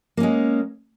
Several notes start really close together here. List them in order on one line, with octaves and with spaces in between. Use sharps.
A#3 C#4 G#3